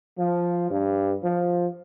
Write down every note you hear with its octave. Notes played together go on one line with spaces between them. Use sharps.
F3
G2
F3